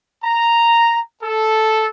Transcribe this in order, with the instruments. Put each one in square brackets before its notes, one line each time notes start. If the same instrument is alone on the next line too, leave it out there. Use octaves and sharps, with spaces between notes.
[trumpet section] A#5
A4